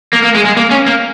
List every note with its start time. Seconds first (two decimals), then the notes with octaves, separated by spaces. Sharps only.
0.13 A#3
0.24 A#3
0.35 G#3
0.45 G#3
0.57 A#3
0.71 C#4
0.86 A#3